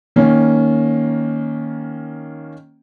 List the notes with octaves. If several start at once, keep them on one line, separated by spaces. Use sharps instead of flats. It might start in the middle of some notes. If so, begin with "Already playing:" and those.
D#3 A#3 C#4